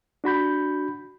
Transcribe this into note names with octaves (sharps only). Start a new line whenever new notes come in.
D4 F#4 B5 G6